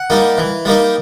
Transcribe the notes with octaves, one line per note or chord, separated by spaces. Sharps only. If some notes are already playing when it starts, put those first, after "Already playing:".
Already playing: F#5
G3 A#3 D#4
E3
G3 A#3 D#4